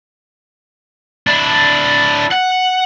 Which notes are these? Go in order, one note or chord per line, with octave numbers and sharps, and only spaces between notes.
D4 E4
F#5